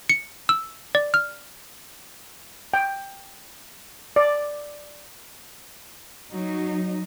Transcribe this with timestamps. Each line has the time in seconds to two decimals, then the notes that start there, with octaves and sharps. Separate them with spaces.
0.09 C#7
0.49 E6
0.95 D5
1.14 F6
2.74 G5
4.16 D5
6.31 F#3 D#4